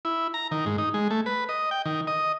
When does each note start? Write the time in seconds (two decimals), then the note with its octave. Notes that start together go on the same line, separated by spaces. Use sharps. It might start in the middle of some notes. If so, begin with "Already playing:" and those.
0.05 E4
0.34 A#5
0.52 D#3
0.66 G#2
0.78 D#4
0.94 G#3
1.11 A3
1.26 B4
1.49 D#5
1.71 G5
1.86 D#3
2.07 D#5